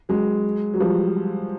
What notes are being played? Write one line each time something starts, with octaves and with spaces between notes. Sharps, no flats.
F#3 G#3
F#3
F3 G3